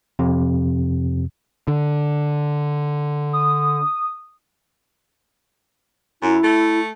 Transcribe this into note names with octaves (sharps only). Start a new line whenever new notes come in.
F2 C3
D3
D#6
F#2 E4
A3